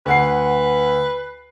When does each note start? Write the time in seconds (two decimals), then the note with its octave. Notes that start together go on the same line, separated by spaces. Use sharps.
0.06 D2 B4 F#5 C7